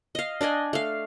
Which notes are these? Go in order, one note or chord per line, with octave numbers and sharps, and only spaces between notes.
D#5 F5
D4 D5 D#5 G#5
A3 F5